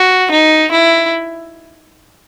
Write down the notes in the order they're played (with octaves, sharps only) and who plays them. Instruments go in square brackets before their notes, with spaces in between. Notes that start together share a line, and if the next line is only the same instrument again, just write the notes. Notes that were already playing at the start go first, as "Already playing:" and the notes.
Already playing: [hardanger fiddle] F#4
D#4
E4